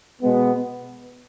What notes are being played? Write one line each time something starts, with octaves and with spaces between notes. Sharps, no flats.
B2 G#3 B3